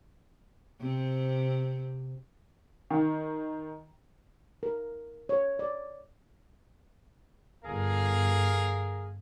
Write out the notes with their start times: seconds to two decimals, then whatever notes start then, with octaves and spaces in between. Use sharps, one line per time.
0.80 C3 C4
2.90 D#3
4.63 A#4
5.29 C#5
5.59 D5
7.65 G1 G#4 A#4 F5